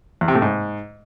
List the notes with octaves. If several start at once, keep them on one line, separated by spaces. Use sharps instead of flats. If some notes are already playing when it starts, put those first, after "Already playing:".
E2
C3
A2
G#2